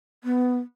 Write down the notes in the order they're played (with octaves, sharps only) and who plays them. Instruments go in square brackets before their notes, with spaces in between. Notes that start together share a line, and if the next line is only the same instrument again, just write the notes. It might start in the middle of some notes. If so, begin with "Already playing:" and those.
[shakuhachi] B3